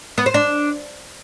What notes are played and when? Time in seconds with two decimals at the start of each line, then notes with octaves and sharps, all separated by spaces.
0.18 B3
0.26 C5
0.34 D4